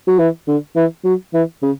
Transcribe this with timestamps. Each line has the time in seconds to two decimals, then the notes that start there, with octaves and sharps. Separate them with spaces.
0.08 F#3
0.19 E3
0.48 D3
0.76 E3
1.04 F#3
1.33 E3
1.62 C#3